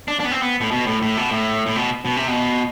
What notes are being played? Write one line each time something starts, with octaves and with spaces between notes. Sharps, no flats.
D4
D4
B3
C4
B3
A2
B2
A2
A2
B2
A2
A2
B2
B2
C3
B2